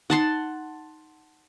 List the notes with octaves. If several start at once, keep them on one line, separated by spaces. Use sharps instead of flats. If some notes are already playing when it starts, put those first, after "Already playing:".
D#4 F#5 A5 C6